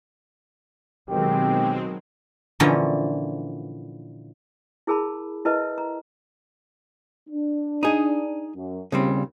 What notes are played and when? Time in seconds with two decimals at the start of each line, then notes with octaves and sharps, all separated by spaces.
1.09 B2 D#3 F#3 G#3 C4 G4
2.60 A#2 D3 E3 F3 C#4 A#5
4.87 E4 G#4 A#4 A5 B5
5.45 E4 A#4 B4 D#5 E5 A5
5.78 A#5
7.29 D4
7.83 D#4 G#4
8.55 F#2
8.92 D#2 A#2 C#3 G3 C4